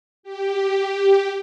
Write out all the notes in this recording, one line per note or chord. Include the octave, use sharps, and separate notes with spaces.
G4